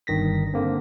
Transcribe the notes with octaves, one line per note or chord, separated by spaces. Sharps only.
G1 G2 D#3 A#6 B6
D3 A#3 C4